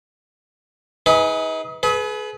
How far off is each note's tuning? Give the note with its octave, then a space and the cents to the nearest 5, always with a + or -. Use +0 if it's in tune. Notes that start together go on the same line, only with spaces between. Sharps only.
D#4 +40 G#4 +0 B4 +0
G#4 +40 B4 +0